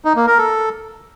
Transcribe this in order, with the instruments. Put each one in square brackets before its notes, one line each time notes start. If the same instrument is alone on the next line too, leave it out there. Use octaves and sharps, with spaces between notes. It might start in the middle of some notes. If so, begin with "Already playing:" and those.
[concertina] D#4
A#3
A#4
A4